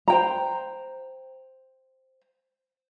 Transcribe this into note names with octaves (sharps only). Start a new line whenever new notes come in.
C5 G5 A#5